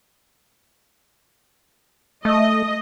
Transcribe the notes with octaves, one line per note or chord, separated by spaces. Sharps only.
A3 D#5